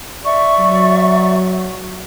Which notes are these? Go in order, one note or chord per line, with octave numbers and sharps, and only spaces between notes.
D5 E5 C#6
F#3